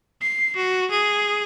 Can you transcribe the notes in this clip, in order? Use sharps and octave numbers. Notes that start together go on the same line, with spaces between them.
C7
F#4
G#4